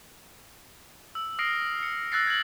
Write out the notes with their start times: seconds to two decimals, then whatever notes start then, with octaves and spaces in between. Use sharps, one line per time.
1.15 E6
1.39 D#6 F6 A#6 C7 D7
1.83 C#7
2.12 E6 F#6 A6 A#6 C7
2.27 G#6 F#7